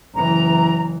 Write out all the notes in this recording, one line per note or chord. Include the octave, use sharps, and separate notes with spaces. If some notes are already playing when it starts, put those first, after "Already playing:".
F#1 E3 A#5